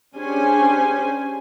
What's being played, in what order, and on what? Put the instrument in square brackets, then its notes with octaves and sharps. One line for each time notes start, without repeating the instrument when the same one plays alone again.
[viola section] C#4 D4 G4 G#4 C5 G#5